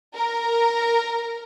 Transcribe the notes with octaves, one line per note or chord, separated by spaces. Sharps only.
A#4